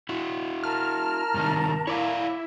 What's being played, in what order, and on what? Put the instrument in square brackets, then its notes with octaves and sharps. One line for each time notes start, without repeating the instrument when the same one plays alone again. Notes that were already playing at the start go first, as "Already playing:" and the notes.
[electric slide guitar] E4 F#4
[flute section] A#4 A5 A#5 [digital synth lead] F6
[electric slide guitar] G2 C3 D#3
[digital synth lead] E4 [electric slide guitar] C#5 D5 F5